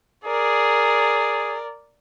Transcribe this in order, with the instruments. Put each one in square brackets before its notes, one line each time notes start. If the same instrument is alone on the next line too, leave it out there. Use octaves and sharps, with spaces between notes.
[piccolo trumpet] G#4 [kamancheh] A#4 D5